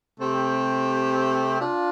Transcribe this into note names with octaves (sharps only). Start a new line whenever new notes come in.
C3 A3 C4 G4
D4 F4